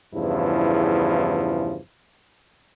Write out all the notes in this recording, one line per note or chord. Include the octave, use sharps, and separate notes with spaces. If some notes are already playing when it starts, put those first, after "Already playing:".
E2 G2 C#3 F3 E4